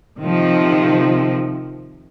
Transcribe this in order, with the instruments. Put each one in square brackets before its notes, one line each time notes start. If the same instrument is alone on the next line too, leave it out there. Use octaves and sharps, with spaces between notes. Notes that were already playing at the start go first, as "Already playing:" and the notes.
[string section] C3 D#3 F3